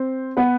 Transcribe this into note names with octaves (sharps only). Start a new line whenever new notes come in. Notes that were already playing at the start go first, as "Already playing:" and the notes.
Already playing: C4 C5
B3 B4